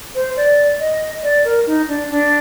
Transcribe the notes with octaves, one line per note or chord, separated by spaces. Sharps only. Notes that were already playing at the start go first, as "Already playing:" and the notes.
C5
D5
D#5
D5
A#4
D#4
D4
D4